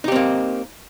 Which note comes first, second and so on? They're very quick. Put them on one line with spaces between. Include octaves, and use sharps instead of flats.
D#4 G4 C4 A#3